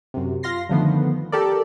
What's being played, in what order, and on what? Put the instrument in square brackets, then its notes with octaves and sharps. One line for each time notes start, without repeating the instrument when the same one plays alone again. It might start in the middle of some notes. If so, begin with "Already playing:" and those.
[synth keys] F#2 C3
F4 F5 C6 A#6 C7
D3 D#3 F3 A3 B3
G4 A4 A#4 D5